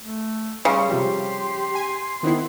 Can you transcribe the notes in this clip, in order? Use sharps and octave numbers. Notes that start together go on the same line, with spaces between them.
A3
C#3 G3 C6
C3 F3 G3 G4
G#5
D#3 B3 C4 E4